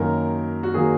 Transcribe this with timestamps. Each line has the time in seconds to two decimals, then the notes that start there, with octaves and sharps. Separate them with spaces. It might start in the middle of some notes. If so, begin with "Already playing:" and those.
Already playing: F#2 D#3 F#3 A#3 A#4
0.63 F#4
0.74 D#3 F#3 A#3 G#4